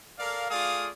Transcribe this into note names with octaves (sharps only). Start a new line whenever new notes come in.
A4 A#4 D5 F5
A3 F4 G#4 D5 F5 D#6